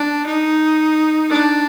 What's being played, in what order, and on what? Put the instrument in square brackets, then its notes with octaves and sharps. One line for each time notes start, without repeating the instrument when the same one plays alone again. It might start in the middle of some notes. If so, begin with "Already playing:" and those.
Already playing: [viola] D4
D#4
D4